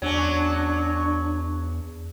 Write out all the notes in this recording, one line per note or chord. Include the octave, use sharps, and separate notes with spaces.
E2 F#3 C#4 D4